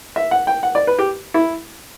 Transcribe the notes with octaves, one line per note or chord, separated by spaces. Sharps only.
E5
F#5
G5
F#5
D5
B4
G4
E4